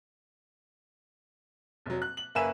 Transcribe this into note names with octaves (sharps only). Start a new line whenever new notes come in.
F1 F#3
F#6
F#7
F#1 A#3 B4 E5 G#5 E7